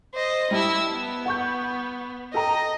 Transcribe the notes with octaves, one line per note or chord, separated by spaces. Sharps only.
C5 D#5
G3 E4 A5 E6
B3
F#5 C#6 G6
A4 D#5 G5 A#5